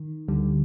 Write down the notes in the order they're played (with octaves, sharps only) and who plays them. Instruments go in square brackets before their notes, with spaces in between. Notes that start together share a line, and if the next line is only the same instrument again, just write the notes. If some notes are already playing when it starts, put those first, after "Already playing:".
Already playing: [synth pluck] D#3
D2 D3 G3